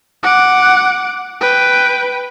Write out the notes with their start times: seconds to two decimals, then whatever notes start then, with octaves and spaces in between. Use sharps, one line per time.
0.23 F#5 D6
1.41 B4 G5